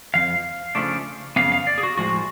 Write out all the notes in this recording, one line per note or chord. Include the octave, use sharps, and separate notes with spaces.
F2 F3 F5
C#3 F3 A3 D4
F#2 C#3 F3 B3 F5
F5
D5
G#4
F#4
A2 F3 G#3 F#4